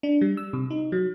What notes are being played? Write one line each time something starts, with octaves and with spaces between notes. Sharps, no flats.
D4
G3
E6
C3
D#4
F#3